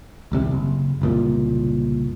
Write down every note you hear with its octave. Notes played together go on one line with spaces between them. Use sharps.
D#1 C2 C3
F#1
F#1 C2 A#2